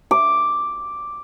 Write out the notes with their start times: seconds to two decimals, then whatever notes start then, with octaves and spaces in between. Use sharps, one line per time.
0.11 D6